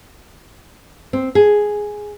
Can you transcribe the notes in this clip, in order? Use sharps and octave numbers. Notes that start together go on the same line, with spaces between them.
C4
G#4